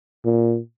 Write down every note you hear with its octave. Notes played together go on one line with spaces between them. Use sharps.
A#2